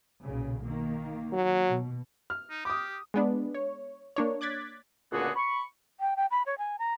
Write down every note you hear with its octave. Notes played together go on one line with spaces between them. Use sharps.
B1 A#2 C#3
D#3 A#3
F#3
B2
F6
D#4
G4 D6 D#6
G#3 B3 D4
C#5
A#3 D4 C#5
D6 F#6 G#6 A6 B6
C#2 A#2 D3 B3 F#4 G#4
B5 C#6
G5
G5
B5
C#5
G#5
A#5